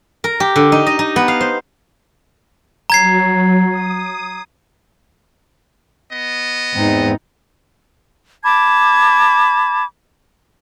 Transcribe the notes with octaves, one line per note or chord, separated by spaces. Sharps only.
A#4
G4
D3
D#4
D#5
D#4
B3
F5
C5
F#3 A#5 G#6 C7
D#6
B3 D#5
E2 G#2 C4 D#4
A5 B5 D6 G#6